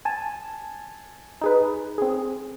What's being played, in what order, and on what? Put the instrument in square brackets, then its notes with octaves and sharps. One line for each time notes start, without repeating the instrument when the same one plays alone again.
[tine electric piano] G#5 A5
[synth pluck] D#4 G#4 B4
C4 G#4